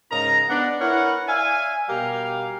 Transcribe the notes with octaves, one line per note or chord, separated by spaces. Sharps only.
G#2 C#3 D#4 A#4 A#5
B3 D4 F#5
E4 A#4 B4 C#5 F#5
D5 E5 F5 G#5
B2 G3 G4 A#4 F5 G#5